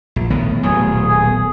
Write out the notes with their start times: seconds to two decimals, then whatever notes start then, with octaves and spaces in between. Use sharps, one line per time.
0.16 A#1
0.30 A2 D#3 B3
0.63 D#1 B1 A3 G#4
1.07 G#4